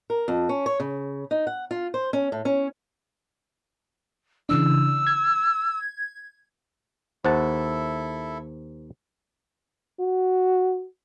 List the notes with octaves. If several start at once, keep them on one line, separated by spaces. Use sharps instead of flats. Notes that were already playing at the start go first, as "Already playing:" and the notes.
A#4
F2
C#4
C#5
C#3
D#4
F#5
F4
C5
C#4
A2
C#4
C#3 E3 D4 E6
G#6
D#2 E4 A4 C5 E5 F#5 A5
F#4